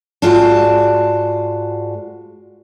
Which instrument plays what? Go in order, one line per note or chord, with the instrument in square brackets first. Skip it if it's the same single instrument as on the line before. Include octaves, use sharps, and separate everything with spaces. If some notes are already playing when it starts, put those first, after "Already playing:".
[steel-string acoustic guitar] G#2 G#3 F4 F#4 D5 A5